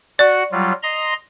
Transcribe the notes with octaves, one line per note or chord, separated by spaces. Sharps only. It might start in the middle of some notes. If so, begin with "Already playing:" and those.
F#4 D5 F#5
F#3 G3 F4
D#5 A#5 C6